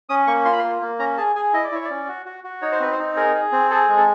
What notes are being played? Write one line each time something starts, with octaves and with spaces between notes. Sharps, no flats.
C#4 D#6
A#3 C#6
F4 C6
B5
A#3 C6
A#3
C#4 A#5
G#4 A5
G#4 G#5
E4 D#5
D5
E4 C#5
D5
C#4
F#4
F#4
F#4
D#4 C#5
C5
C4 B4
C5
D#4
G#4 A#4
G#4
C4
G#4 A4
G#3
A4